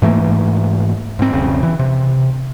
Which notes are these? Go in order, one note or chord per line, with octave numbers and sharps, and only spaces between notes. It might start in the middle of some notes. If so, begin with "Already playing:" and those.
G#2 E3 A3 A#3
G#2 C4
E1 B1 C#3 C4
E3
C3